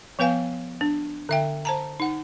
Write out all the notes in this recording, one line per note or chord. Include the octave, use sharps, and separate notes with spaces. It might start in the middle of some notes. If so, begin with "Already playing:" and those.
F3 B3 B4 F5 G#5
D4
D3 E5 G5
C5 A5 A#5
D#4 F#5